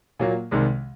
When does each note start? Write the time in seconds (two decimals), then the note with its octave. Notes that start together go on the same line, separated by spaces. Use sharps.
0.19 A#2 F#3 A#3
0.51 C2 C3 D#3 G#3